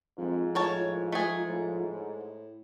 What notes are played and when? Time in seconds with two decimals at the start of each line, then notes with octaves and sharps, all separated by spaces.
0.18 F2 G#2 F3 F4
0.55 A2 A#4 C#5 A5
1.12 A3 G#4
1.49 A2
1.90 A2